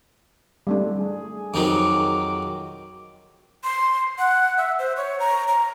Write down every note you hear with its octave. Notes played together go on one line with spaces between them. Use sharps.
G3 A3 D4
G#4
F2 D#3 F#3 D6
C6
F#5
E5
C5
C#5
A#5
A#5